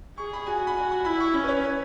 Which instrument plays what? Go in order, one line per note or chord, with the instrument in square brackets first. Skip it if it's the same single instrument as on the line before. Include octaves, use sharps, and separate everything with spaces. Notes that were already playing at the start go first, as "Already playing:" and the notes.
[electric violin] G#4 [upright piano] C#6
[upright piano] B5
[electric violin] F#4 [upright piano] G#5
[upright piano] B5
[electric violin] F#4 [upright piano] G#5
[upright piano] B5
[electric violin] E4 [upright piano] B5
[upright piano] C#6
[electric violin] C#4 [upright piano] B5
[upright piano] B4
C#5
B4